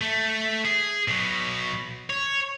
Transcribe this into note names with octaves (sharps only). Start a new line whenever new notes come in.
A3
G#4
B2 F#3
C#5